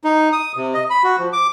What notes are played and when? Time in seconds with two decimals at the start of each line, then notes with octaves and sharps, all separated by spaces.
0.04 D#4
0.32 D#6
0.57 C3
0.74 D#5
0.90 B5
1.04 F#4
1.19 F3
1.33 D6